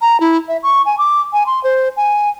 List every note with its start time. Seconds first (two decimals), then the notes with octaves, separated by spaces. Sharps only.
0.01 A#5
0.20 E4
0.48 E5
0.63 C#6
0.86 G#5
0.98 D6
1.33 G#5
1.47 C6
1.64 C5
1.97 G#5